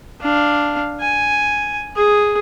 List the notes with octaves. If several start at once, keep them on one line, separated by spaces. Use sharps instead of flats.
D4 F5
G#5
G#4